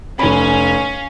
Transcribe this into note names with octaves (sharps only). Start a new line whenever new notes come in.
F1 C#4 F5 B5